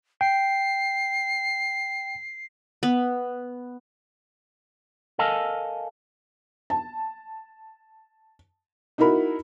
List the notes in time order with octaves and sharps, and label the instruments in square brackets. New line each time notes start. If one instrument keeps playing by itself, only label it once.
[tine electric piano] G5 [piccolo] C7
[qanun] B3
[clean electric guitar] A4 A#4 D#5 F5 G#5 A5
[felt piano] A5
D#4 E4 F#4 A#4 B5